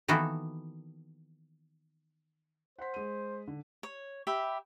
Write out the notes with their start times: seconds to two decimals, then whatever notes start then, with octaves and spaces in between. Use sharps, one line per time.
0.08 D#3 E3 A#3 B3 F#4 A4
2.79 C5 F#5 B6
2.94 G#3 D#7
3.48 D3
3.83 C#5
4.27 G4 E5 B5